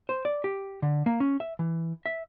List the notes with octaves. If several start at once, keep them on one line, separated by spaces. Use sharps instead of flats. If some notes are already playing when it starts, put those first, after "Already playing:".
C5
D5
G4
D3
A#3
C#4
E5
E3
E5